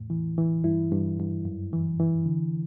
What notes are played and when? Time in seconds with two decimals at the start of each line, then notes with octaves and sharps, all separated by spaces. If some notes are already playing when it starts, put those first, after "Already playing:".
Already playing: E2 A2
0.10 E3
0.38 E3
0.64 G2 E4
0.91 G2
1.19 G2
1.45 F#2
1.73 E3
2.00 E3
2.26 D3